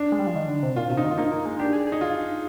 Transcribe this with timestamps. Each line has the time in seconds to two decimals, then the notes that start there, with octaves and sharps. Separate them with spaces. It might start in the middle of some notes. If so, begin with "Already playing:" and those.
Already playing: D4
0.12 G#3
0.19 G3
0.27 F3
0.35 D#3
0.48 D3
0.63 C3
0.76 A#2 F4
0.90 C3 F4
0.97 D#4
1.04 D#3
1.11 F4
1.18 A#3 D#4
1.32 A#3
1.46 G#3
1.59 D4 G4
1.73 G#4
1.87 G#4
1.92 D#4
2.01 F4